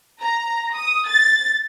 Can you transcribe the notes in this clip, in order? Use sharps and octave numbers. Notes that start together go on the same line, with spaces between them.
A#5
D#6
A6